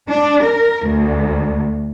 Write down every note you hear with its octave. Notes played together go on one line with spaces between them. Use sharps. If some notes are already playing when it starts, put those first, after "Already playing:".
D4
A#4
D2